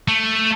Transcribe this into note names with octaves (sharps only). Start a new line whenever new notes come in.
A3